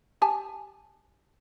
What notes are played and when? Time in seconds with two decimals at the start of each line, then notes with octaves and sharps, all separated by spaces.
0.22 G4 G#5 A5